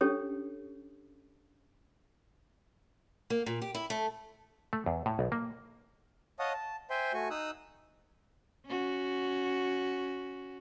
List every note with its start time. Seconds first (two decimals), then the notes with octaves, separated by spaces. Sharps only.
0.01 C#4 D4 G4 A4 C#5
3.30 A#3
3.46 A#2
3.62 G4
3.75 E4
3.90 A3
4.73 A3
4.86 E2
5.06 A2
5.19 B1
5.32 A#3
6.39 C#5 D#5 F5 F#5 A5 D#6
6.53 A5
6.90 C5 E5 G5 G#5 C6
7.14 A3 F#4 G#5 C#6
7.30 D#4 D#6 E6 F#6
8.65 C#4 F#4